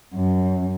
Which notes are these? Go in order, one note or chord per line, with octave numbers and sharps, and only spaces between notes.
F#2